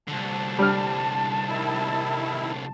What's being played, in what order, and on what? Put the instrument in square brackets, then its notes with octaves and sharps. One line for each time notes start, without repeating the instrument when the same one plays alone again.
[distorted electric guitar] C2 D3 [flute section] A5
[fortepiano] G3 F6
[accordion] D#3 E4